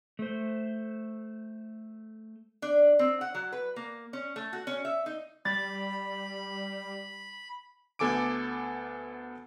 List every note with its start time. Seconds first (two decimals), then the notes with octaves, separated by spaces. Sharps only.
0.19 A3 C5
2.62 D4
2.99 C4
3.21 F#5
3.34 F#3
3.52 B4
3.76 A#3
4.13 C#4
4.36 A3
4.53 F#4
4.67 C#4
4.85 E5
5.06 D#4
5.45 G3 B5 A6
7.99 D2 B3 A4 G#5 D6 D7